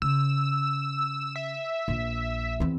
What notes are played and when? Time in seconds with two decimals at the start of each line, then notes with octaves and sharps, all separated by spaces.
0.02 C#3 E6
1.36 E5
1.88 A#1
2.60 E2 C4